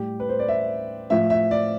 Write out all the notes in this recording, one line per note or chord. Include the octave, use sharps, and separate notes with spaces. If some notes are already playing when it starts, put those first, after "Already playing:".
Already playing: A2 G3 G4
B4
C5
D5
E5
A2 F3 E5
E5
D5